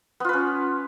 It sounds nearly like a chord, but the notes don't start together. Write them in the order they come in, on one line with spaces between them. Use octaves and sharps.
B3 F4 B4 C#4